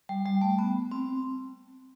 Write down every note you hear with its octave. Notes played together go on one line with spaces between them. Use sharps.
G3
G3
A3
B3
C4